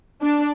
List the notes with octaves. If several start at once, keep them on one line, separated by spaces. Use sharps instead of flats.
D4